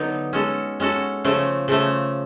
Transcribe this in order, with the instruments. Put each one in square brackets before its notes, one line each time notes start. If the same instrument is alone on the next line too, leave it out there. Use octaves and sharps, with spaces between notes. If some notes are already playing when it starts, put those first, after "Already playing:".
Already playing: [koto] D3 F#3 B3 D#4
G#3 C#4 F#4 A4
G#3 C#4 F#4 A4
C#3 F3 A3
C#3 F3 A3